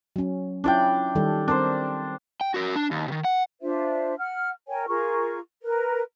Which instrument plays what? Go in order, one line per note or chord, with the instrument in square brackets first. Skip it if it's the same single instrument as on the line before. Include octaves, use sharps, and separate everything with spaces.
[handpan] F#3 C#4
[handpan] C#4 E4 F4 [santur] D4 D5 G5
[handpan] D#3 G3 A4
[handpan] C4 A#4 D5 [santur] D4 C5
[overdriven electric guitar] G5
F#4 A#4
D4
D#2
C3 D#3
F#5
[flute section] D4 F4 C5 E5
F#5 F6
A#4 C#5 G5 G#5
F4 G#4 A#4 C#6
A#4 B4